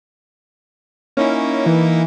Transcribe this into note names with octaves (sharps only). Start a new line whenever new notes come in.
A#3 C#4 D#4 E4
E3